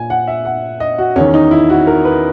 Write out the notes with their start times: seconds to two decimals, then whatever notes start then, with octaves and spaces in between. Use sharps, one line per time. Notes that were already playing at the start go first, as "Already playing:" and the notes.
Already playing: A#2 G#5
0.10 F#5
0.28 E5
0.45 F#5
0.80 D#5
0.98 F#4
1.16 E2 D#3 C#4
1.34 D#4
1.51 E4
1.70 F#4
1.87 A#4
2.05 B4